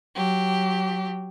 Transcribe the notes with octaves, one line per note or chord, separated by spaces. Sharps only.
F#3 G4